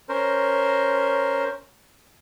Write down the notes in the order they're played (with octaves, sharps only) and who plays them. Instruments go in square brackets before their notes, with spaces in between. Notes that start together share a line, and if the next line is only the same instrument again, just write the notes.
[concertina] C#4 A#4 C5